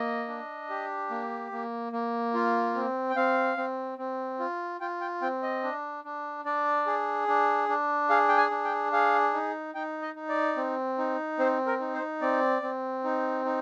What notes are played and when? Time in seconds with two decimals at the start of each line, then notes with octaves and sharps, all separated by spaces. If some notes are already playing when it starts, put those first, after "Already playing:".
Already playing: A#3 D#5
0.28 D4
0.70 G4
1.10 A#3
1.52 A#3
1.93 A#3
2.34 F4
2.75 C4
3.10 G5
3.16 C4 F5
3.57 C4
3.98 C4
4.39 F4
4.81 F4 G5
5.01 G5
5.21 C4 G5
5.43 D#5
5.63 D4
6.04 D4
6.45 D4 D5
6.87 G#4
7.28 D4
7.69 D4
8.10 G#4 F5
8.29 G5
8.37 G#5
8.51 D4
8.65 G5
8.92 G#4 F5
9.34 D#4
9.75 D#4 G5
10.02 D#5
10.16 D#4
10.29 D5
10.57 C4
10.98 D#4
11.39 C4 C5
11.66 A#4
11.80 D#4
11.94 C5
12.21 C4 D5
12.62 C4
13.04 D#4
13.45 D#4